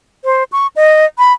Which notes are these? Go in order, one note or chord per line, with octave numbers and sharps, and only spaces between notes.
C5
C#6
D#5
B5